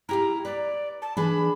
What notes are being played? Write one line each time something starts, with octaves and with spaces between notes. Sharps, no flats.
E4 G4 F5 A#5
B4 D5
A5
E3 D4 G#4 B5